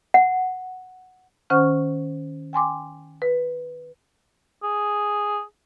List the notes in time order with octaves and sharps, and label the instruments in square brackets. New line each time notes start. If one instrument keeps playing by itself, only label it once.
[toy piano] F#5
[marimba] D#3 C#4 C5 F#5 C#6 F6
G5 G#5 C6 D6
B4
[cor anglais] G#4